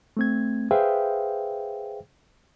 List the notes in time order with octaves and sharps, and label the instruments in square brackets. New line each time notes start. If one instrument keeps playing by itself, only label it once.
[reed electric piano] A3 C4 G#6
G#4 B4 C5 E5 F5 G5